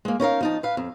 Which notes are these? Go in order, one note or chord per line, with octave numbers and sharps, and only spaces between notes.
G#3 A#3
C#4 D#4 A#4 F5
F3 D#4 A5
B4 F5
F2